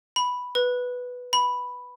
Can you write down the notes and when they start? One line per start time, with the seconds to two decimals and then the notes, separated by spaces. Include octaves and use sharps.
0.16 B5
0.55 B4
1.33 B5